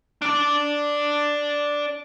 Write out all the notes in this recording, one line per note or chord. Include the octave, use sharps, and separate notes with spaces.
D4 D5